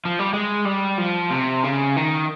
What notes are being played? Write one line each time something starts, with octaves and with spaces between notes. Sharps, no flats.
F3
G3
G#3
G3
F3
C3
C#3
D#3